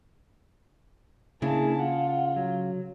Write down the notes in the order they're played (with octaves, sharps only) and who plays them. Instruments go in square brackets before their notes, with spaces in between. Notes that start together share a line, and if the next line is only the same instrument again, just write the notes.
[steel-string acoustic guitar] C#3 [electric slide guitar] A#3 D4 E4 [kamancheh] G#4 A5
[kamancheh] F4 [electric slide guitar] F#5
[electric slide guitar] F#3